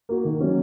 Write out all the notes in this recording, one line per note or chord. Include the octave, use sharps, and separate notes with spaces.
A#3 F#4
D#3
F#3 C#4